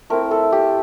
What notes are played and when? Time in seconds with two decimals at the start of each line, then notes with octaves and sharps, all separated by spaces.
0.10 A3 C4 E4 A#4
0.31 A4
0.52 G4